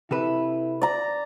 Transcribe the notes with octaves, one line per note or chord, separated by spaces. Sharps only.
C3 E4 A4 B4
D5 A#5